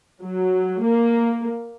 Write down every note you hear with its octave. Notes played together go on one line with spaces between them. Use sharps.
F#3
A#3